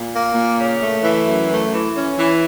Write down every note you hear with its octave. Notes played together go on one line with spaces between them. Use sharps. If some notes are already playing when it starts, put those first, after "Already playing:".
Already playing: A#2
A#3
A#2
C#3
A3
E3
F#2
A3
E3
C#4
E3